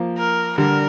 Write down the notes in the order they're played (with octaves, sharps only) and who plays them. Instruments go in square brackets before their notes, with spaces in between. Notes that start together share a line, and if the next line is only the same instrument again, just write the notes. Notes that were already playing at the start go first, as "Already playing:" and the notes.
Already playing: [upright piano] F3 A#3
[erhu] A#4
[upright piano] D3 G3 [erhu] A#4